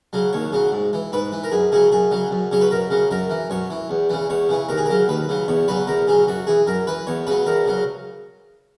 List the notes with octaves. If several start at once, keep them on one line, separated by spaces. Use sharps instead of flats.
C#3 F#3
D#2 C#5
C#3 F#3
G#2
E3
G#2 B4
E3
A#4
F#2 G#4
C#3 F#3 G#4
F#2 G#4
C#3 F#3
F#2
C#3 F#3 C#5
B4
F#2 A#4
C#3 F#3
F#2 A#4
E3
F#2 C#5
E3
E2
C#3 E3
E2 C#5
C#3 E3
D#2 A#4
G#4
C#3 F#3 A#4
D#2 B4
C#3 F#3
E2 C#5
C#3 F#3 B4
E2 A#4
C#3 F#3 G#4
F#2 F#4
E3 G#4
F#2 A#4
E3 B4
E2 C#5
C#3 F#3 B4
E2 A#4
C#3 F#3